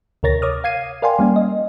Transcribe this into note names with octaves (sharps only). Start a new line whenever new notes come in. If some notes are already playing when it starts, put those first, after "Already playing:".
D2 C3 A#4 C#5 A6 A#6
C#5 D6 D#6 F6
F5 G#6 C7 D#7
A#4 D5 F5 G5 G#5 C6
G3 A#3 C#4
D#5